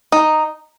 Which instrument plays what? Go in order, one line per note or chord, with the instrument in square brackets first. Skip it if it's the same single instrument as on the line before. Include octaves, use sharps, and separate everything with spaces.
[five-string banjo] D#4